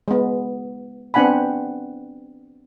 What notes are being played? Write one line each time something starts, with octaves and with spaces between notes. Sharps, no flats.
G#3 B3
B3 C4 D4 F#5 G#5 B5